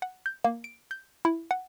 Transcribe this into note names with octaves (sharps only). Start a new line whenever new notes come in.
F#5
G6
A#3
D7
G6
E4
F#5